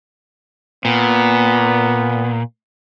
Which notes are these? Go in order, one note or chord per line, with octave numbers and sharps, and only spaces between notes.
A#2 B3